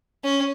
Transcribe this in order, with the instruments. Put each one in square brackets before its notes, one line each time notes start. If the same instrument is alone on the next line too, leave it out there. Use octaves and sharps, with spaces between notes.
[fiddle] C#4